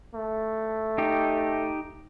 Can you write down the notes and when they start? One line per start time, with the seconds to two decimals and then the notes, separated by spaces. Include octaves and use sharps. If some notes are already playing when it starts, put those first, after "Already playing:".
0.14 A3
0.98 D#4 G4